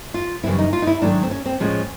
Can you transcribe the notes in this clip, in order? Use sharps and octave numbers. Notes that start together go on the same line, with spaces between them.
F4
F#2 C#3 E3 G3 C4 E4
D#4
F4
D#4
E4
G#2 D#3 F#3 A3 D4
C4
C#4
C4
A2 F3 G#3 C#4